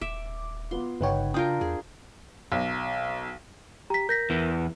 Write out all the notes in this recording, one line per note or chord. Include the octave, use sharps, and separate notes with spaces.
D#1 E5 D6
B3 F4 C6
G1 C#3 D#4 B4 C#5 F#5 G5
D4 F4 A#4 G5 D#6 G6
E2 G#4
B1
G4 A#5 B6
A#4 G6 A#6 B6
E2 E3